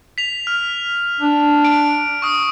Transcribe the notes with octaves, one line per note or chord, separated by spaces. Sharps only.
B6 F7
F6
D4
D7
C#6 D#6